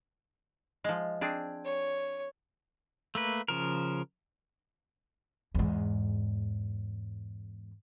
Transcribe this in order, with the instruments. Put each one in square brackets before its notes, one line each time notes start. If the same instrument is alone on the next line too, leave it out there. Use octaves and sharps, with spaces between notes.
[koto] F3 G#3
C4 D4 G#4
[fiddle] C#5
[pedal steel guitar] A3 A#3 B4
C#3 F3 A#4
[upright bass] E2 G#2